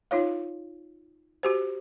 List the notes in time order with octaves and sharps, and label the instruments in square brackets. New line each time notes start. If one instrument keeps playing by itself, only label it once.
[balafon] D#4 F4 C#5 F5
F#4 G4 C5